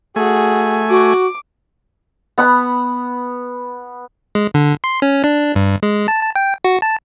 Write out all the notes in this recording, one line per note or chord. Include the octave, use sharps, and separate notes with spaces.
A3 F#4 G#4 G#5
F#4 D6
B3 F#5 B5
G#3
D3
C6
C#4
D4
G2
G#3
A5
A5
G5
F#4
A5